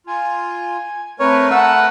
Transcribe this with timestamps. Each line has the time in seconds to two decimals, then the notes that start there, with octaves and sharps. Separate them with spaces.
0.07 F4 G#5
1.20 A3 C4 A#4 B4 C#5
1.51 F#5 A5 E6